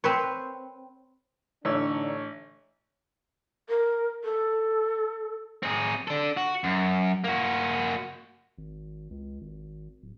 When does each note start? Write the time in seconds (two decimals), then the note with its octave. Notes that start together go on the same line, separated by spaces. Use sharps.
0.04 C4 B4 C#5
1.65 A1 D3 D4 D#4 C#5 E6
3.69 A#4
4.24 A4
5.63 C4 G#4
6.08 D4 A4
6.37 F#4
6.64 F#2
7.24 A#3 F#4
8.58 G#1
9.10 C#2
9.41 G#1
10.02 D1